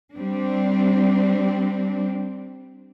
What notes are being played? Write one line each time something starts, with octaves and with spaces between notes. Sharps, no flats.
G3 C4 D4